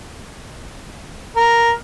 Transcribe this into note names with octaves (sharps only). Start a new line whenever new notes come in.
A#4